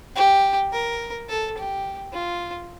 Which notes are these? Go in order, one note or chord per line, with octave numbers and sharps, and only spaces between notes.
G4
A#4
A4
G4
F4